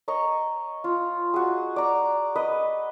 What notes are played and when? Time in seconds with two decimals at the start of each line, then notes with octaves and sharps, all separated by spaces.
0.08 C#5 D#5 A#5 C#6
0.84 F4
1.34 F#4 G#4
1.76 D5 A#5
2.35 B4 D#5